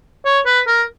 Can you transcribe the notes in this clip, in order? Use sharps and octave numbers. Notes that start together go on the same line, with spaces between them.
C#5
B4
A#4